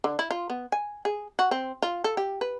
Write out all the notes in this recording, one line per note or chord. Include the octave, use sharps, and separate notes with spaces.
D3
E4
F4
B3
G#5
G#4
F#4
C4
F4
A4
G4
B4